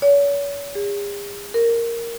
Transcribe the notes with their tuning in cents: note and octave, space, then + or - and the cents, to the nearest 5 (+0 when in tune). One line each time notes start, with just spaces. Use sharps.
C#5 +40
G#4 -40
A#4 -5